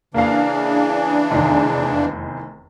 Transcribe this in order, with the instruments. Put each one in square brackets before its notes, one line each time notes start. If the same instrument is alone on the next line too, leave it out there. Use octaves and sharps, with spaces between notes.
[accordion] C#3 E3 D4 [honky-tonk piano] A#3 F5
[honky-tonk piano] F1 E2 D#3